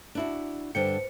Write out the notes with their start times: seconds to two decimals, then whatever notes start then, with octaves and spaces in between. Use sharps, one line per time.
0.15 D4 E4 F#4
0.75 G2 D3 B4 C5 G5 C#7